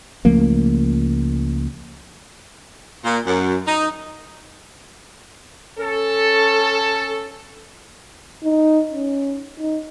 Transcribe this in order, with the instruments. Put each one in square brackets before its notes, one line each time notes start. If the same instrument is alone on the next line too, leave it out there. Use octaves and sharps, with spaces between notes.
[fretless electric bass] C#2 F3 A3 A#3
[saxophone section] A#2
F#2
D#4
[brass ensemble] C#4 A4
[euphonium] D#4
C#4
D#4